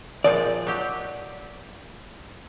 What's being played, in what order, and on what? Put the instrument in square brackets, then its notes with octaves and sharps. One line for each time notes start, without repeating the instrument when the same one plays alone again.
[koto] A#2 F3 G#3 [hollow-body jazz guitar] D5
[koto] F#3 G4